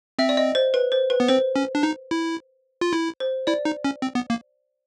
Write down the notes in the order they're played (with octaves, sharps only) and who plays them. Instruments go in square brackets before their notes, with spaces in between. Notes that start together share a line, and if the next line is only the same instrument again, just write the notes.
[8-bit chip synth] C4 [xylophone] E5
[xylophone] D5
D#5
C5
B4
C5
B4
[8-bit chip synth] B3
[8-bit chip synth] C4 [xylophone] C5
[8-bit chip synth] C#4
D4
D#4
E4
F4
E4
[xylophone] C5
[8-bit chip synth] E4 [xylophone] D5
[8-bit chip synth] D#4
C#4
C4
B3
A#3